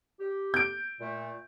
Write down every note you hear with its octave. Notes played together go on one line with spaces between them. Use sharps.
G4
G6 D7
A#2 A3